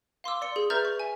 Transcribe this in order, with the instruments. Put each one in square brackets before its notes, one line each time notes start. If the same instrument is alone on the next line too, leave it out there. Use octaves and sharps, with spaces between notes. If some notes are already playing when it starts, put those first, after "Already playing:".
[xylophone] F5 C6 D6 E6
D5 C6 C#7
G#4
B4 E5 A#5 F6 G6 A6
C#6
E5 G#5